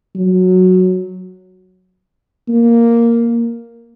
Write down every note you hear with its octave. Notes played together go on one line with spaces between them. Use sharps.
F#3
A#3